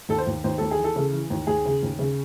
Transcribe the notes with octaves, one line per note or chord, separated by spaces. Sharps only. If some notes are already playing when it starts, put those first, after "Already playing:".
D#2 A4
C5
D#2
D#2 C5
D#2 A4
G#4
E3
A4
C#3
E3
D#2
D#2 G#4
C#3
D#2
C#3